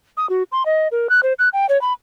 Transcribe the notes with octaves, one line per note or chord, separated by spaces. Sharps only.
D#6
F#4
C6
D#5
A#4
F#6
C5
F#6
G5
C#5
B5